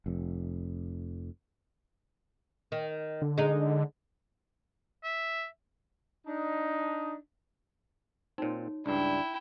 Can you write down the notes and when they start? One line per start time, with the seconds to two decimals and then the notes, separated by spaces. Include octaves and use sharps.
0.06 F1 F2
2.72 D#3
3.21 D3
3.38 G#3 D#4
5.04 E5
6.26 D4 D#4
8.38 A#2 C4 D#4 F#4 C#5
8.86 C#2 G2 D4 E4 G5